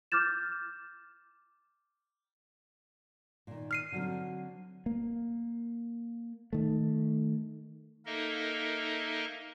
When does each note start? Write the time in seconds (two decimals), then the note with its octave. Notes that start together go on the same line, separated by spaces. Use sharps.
0.12 D6 F6 G6 A6 E7
3.47 A#2 D#3
3.71 F6 C7 D#7
3.92 D3 F#3 C4
4.86 A#3
6.53 D#3 A3
8.06 A#3 D#4 A4 A#4 D#5 E5